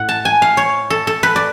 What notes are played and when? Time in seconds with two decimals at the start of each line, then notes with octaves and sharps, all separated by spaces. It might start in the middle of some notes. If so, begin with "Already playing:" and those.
Already playing: A2 F#5
0.09 A5
0.25 G#5
0.42 F5
0.57 C#5
0.90 A4
1.07 A4
1.23 B4
1.36 D5